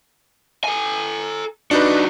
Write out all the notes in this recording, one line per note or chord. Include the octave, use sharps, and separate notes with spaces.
A4 G#5
G3 D4 D#4 F#4 B4